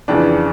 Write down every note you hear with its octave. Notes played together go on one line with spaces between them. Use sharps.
F2 C#3 E3 D4